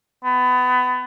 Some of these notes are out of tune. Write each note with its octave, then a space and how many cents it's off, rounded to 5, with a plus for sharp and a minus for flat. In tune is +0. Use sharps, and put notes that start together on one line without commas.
B3 +25